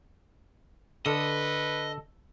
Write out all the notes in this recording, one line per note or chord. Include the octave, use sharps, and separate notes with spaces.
D3 A4 B4 D#5